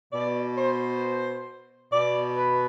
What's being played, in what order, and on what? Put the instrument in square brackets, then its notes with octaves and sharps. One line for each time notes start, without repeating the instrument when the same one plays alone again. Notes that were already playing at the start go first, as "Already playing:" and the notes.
[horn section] B2 D5
C5
B2 D5
B4